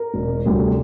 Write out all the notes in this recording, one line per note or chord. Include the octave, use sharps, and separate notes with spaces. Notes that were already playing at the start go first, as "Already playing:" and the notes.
Already playing: A#4
E1
D2 C3 G3